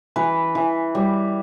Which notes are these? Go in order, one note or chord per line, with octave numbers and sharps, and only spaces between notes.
E3 B4
E3
G3